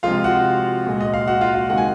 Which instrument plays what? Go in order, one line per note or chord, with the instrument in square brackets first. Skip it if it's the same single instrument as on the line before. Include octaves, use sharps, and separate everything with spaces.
[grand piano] C3 F3 G#3 F4 F5
F#4 F#5
A#2 G#3
D#5
F5
F#4 F#5
F4 F5
F4 F5
C3 D#3 G#3 F#5
G#5